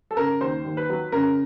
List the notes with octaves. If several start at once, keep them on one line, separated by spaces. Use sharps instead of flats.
A4
C#3 A#4
D#2 C5
D#2
B4
F#3
C#3 A#4